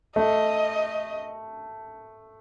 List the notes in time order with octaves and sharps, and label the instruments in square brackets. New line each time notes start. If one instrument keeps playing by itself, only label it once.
[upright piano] A3 [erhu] D#5